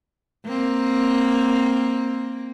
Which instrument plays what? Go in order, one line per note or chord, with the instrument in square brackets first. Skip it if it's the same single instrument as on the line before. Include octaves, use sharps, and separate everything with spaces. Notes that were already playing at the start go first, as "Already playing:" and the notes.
[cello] A#3 C4